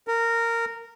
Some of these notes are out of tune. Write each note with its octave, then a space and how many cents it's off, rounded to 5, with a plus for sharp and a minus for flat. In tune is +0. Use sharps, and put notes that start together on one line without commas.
A#4 -15